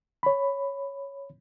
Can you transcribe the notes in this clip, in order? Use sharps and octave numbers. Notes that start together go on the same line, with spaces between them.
C#5 B5